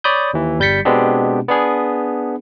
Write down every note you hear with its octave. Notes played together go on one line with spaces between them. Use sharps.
C#5 D5 B5 D#6 G6
D#2 E3
G1 G3 G6 A6 B6 C#7
B2 G#3 B3 C4 D4 G4
B3 D4 G#4